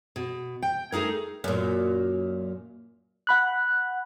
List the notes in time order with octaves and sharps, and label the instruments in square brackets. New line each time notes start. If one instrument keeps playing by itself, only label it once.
[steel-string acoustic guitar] B2
G5
A3 D#4 G#4 A#4
[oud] F#2 A#2
[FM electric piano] F#5 B5 F#6